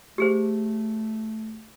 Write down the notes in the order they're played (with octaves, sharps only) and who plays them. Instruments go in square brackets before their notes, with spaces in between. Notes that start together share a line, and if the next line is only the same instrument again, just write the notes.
[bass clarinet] A3 [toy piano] G4 G#4 C5